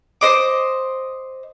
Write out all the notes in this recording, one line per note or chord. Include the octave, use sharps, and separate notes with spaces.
C5 D#5 D6